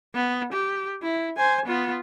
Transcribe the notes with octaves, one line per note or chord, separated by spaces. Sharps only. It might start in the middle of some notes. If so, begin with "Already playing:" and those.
B3
G4
E4
C5 G#5
B3 F4